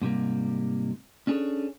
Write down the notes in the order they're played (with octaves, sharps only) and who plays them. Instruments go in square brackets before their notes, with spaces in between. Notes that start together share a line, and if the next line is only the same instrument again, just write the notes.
[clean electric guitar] G#2 C3 G3 A#3
C#4 D4 G#4 A4 C#5